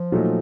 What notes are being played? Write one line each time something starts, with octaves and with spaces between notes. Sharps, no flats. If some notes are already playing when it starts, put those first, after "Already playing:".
Already playing: F3
A#2 F#3 A3 D#4